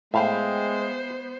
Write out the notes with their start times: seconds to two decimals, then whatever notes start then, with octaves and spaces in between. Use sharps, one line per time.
0.14 A2 G#3 B3 C5 E5 F5 G5